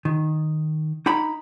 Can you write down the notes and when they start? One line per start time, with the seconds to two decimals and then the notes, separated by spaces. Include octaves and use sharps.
0.05 D#3
1.06 D#4 A#5 B5